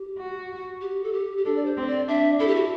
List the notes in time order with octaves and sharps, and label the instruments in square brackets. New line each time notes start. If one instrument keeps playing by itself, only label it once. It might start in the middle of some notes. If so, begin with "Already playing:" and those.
Already playing: [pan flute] G4
[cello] F#4
[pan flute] G4
A4
G4
G4
[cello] D4 [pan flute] A4
[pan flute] D5
C5
[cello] C4
[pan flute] D5
[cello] D4 [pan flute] E5
[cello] E4 [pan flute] A4
[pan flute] G4
F#4